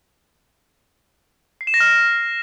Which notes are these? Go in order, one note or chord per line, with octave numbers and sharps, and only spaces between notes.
C7
E7
A#6
F6